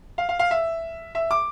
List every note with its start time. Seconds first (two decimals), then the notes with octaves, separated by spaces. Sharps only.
0.18 F5
0.29 F5
0.39 F5
0.51 E5
1.15 E5
1.31 D6